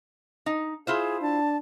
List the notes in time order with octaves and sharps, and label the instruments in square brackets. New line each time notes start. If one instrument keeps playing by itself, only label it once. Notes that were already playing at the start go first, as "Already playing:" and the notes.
[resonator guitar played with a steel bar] D#4
[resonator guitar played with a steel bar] E4 F4 C5 [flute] G#4
[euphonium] D4 [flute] A5